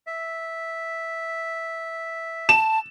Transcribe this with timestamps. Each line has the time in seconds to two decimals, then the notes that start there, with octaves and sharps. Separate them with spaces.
0.07 E5
2.49 A5 E7